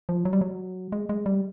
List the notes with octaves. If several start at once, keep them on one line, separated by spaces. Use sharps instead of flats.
F3
F#3
G3
F#3
G#3
G#3
G3